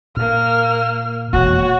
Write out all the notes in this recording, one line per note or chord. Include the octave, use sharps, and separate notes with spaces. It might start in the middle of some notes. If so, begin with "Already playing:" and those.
A#2 A#3 F6
E1 F2 A#3 F#4 C#5